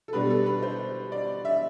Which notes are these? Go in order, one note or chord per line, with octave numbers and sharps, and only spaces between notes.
A4
B2 G3 D4 B4
A4
B4
C5
D5
E5